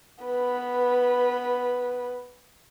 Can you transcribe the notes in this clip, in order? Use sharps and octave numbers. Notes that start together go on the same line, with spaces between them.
B3 B4